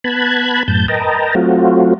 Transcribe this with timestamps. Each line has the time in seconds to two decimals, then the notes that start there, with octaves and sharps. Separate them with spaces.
0.04 B3 A5 B5 F#6 G#6
0.68 F#2 A2 A5 G6
0.88 A#4 B4 D#5 G5 A5 A#5
1.35 F#3 A3 C4 F4 F#4